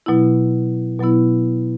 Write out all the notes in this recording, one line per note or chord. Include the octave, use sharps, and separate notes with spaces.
B2 F#3 B3 E4
B2 F#3 B3 E4